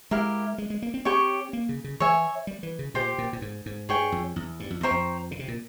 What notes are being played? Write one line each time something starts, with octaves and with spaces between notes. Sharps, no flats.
G#3 E4 G4 A#4 F5
G#3
G#3
A#3
C4
C4 G4 C#5 G5 C#6
A#3
C#3
C#3
E3 C#5 E5 G#5
G3
E3
C#3
A#2 G4 C5 G5
A#2
A#2
G#2
G#2
G2 G#4 C#5 G5
F2
E2
G2
F2
E2 C5 G5 A#5 C#6
F2
C#3
C3
A#2